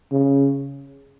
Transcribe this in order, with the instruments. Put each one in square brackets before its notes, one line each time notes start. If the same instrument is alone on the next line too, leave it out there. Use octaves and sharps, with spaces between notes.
[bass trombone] C#3